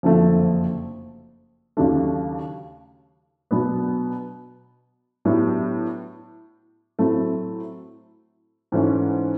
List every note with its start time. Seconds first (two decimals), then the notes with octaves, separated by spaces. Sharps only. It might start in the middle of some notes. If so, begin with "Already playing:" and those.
0.03 F#1 F2 D3 F3 A3
1.77 D#2 C#3 F#3 A3 D4
3.51 B2 F#3 B3 D4
5.25 A2 F#3 B3 D4 G4
6.99 A2 F#3 A3 C4 E4
8.72 G#2 E3 A3 C#4